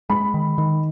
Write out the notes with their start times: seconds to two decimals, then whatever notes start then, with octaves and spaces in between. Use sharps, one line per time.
0.10 G#3 B5
0.34 D#3
0.58 D#3